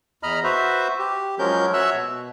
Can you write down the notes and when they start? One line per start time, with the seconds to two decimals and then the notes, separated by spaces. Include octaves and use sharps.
0.23 E2 D#5 A#5 B5 F6
0.44 F#4 B4 C5 E5
0.99 G4
1.39 F3 F#3 G#3 C#4 A#4 G6
1.74 F#4 C#5 E5 E6 F#6
1.94 B2